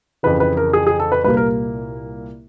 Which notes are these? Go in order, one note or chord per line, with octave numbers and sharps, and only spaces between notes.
F2 C#3 E3 B4
B4
A#4
G#4
G#4
A4
B4
C2 A#2 G3 A#3 B4
A#4